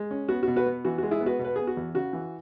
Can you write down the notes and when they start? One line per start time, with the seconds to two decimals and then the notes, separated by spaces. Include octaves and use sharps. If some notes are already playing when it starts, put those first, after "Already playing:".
Already playing: G#3
0.11 C#4
0.29 B3 F#4
0.43 F#4
0.48 B2
0.56 F#4 B4
0.66 B3
0.85 E3 F#4
0.98 G#3 F#4
1.11 E4 G#4
1.21 B3
1.26 F#4 B4
1.39 B2
1.45 B4
1.56 B3 G#4
1.67 F#4
1.77 E2
1.94 C#3 F#4
2.13 E3